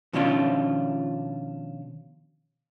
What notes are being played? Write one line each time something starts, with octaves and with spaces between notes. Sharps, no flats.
B2 D#3 F3 C#4 D4 F4